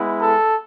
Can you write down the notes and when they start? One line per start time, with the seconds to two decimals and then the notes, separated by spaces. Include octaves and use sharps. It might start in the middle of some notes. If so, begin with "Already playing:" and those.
Already playing: G#3 B3 E4
0.21 A4